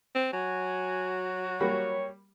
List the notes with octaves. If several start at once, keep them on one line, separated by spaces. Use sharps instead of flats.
C4
F#3 F#4 G#5
G3 A#3 C#5 B5